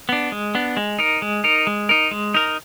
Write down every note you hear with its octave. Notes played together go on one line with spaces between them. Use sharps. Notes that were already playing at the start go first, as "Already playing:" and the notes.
B3 D4
G#3
B3 D4
G#3
D#4 A#4
G#3
D#4 A#4
G#3
D#4 A#4
G#3
D#4 A#4